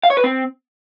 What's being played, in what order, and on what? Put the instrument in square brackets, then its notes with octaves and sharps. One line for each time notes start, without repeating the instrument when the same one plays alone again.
[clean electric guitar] F5
C#5
B4
C4